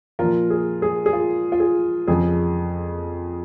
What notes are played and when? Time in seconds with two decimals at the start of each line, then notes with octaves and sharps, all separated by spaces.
0.19 A#2 F3 F4 A#4
0.50 G#4
0.82 G#4
1.06 G#4
1.13 F4
1.52 F4
1.60 G#4
2.08 F2 C#3 F3 G#4